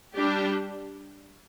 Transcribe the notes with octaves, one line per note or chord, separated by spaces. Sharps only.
G3 D4 G4